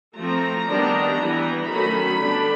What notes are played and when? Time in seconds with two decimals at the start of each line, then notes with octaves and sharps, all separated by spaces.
0.17 F3 A3 C4 A#5
0.67 D#3 G3 B3 D4
1.18 E3 G3 B3
1.68 D#3 F#3 A3 C#4 B5
2.18 D3 G3 B3 D4